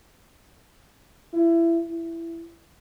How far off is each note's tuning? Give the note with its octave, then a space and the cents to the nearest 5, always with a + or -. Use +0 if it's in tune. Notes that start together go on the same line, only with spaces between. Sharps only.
E4 +20
E4 +15